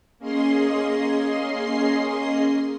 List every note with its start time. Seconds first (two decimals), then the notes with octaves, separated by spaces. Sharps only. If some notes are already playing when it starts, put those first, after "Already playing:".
0.19 A#3 C#4 G#4 D#5 C6 C7